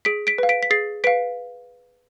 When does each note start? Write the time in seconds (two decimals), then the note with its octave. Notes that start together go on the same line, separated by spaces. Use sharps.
0.05 G#4 B6 D7
0.27 B6 D7
0.38 B4 F5
0.49 B6 D7
0.63 B6
0.70 G#4 A6 C7
1.04 B4 F5 B6 D7